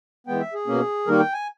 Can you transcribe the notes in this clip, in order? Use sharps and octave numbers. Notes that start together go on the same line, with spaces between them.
E3 G#3 B3 G5
E5
G#4
B2 A#3 C#4
D#3 G3 A#3 D#4 A#4
G5
G#5